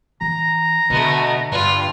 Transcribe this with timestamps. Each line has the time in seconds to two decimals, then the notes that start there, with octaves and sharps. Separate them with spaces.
0.21 E3 A#5
0.90 B2 D3 A3 B3
1.52 G2 F4 B4